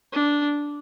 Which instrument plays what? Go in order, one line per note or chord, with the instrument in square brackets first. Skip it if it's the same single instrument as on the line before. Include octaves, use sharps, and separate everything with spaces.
[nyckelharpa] D4